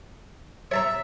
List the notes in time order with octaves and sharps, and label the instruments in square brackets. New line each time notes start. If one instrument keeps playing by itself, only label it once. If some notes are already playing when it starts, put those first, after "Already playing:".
[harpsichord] C#5 A5 A#5 [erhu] E5